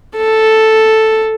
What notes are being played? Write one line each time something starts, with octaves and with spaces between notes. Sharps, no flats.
A4